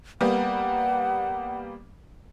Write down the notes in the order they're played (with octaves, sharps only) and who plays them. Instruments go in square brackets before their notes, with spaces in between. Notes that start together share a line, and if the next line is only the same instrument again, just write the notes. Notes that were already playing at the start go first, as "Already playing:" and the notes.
[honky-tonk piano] G3 A#3 B3 [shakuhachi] F#5